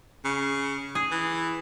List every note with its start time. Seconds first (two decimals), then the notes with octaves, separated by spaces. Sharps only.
0.25 C#3
0.95 G#4
1.11 E3